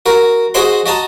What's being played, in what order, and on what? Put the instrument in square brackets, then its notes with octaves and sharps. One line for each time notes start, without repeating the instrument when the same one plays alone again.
[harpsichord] F#4 A#4
F#4 G#4 C5 D#5 F#5 C6
F#4 D#5 A5 A#5